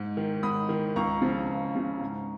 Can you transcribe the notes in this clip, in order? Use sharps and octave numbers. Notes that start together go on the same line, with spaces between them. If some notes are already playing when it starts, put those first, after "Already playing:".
Already playing: G#2
D#3
G#2 B5 D#6
D#3
C#2 A#5 C#6
C#3 F3
C#2
C#3 F3
G#2